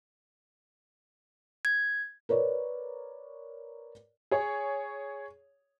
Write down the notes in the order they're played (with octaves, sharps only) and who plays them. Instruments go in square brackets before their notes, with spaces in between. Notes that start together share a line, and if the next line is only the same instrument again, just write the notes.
[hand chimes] G#6
[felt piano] A#4 B4 C#5 D5
[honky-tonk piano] G#4 C#5